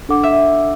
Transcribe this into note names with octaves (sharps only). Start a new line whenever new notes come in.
D4 A4 F#5 D6
E5